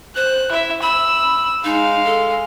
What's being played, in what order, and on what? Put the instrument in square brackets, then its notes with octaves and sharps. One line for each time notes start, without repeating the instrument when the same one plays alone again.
[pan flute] C5 [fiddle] F#6
[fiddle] E4 E5
[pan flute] B5 [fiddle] E6
[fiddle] G#3 F5 [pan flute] D#4
[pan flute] A4